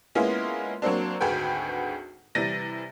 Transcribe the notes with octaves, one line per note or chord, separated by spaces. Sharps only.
G#3 A#3 B3 C#4 E4 F4
F#3 A#3 C4 D4
G#1 D2 F#4 G#4 B4 G5
C3 E3 G3 A6 A#6 D#7